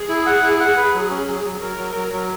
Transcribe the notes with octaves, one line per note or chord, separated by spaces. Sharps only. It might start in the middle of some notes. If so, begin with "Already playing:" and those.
Already playing: G#4
E4
F#5
E4
F#5
B4
F#3
C#4
F#3
F#3
F#3 A#4
F#3
F#3
F#3